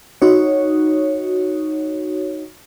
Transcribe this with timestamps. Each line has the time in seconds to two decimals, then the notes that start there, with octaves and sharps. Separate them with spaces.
0.22 D#4 F#4 C#5